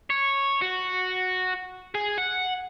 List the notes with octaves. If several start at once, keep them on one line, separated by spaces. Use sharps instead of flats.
C#5
F#4
G#4
F#5